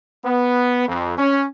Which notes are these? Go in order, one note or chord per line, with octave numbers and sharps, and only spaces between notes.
B3
F2
C#4